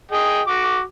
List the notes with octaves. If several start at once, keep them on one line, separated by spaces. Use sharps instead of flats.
G#4 D#5 G5
F#4 D6